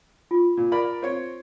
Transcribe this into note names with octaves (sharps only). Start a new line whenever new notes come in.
F4 C#6
A#2
A#4 D5 B5
C4 C5 C#5